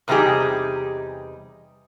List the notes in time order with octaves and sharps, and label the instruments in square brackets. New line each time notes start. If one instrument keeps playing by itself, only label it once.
[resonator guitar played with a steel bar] E2 C3 G3 D#4 G4 G#4